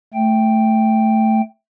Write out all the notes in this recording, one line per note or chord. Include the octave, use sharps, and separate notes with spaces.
A3 G5